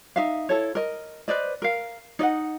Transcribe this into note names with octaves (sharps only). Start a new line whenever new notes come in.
D#4 E5 F5
E4 A4 C#5
A#4 D#5
B4 C5 D5 D#5
A#4 F5
D#4 D5 D#5 F#5